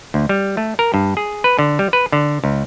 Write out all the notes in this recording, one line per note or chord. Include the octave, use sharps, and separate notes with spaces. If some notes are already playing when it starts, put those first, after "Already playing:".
D2
G3
A3
A#4
G2
G#4
B4
D3
G3
B4
D3
C#2